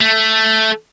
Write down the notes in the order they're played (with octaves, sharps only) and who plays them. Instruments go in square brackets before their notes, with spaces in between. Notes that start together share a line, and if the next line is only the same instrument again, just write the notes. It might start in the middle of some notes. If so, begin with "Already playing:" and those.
[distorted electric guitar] A3